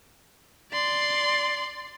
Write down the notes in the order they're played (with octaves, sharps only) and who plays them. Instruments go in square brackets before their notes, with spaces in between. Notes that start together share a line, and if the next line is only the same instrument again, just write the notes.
[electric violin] D5 C6